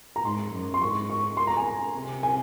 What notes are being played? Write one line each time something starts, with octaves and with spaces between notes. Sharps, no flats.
A#5
G#2 C6
F#2
C6
G#2 C#6
C#6
C6
A#5
G#5
C3
G#5